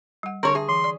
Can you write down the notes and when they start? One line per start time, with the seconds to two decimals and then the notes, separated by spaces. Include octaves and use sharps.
0.23 G3 F#5
0.43 D3 D4 G#4 A#4 C#5
0.55 G#4 E5
0.69 E3 C6
0.84 D5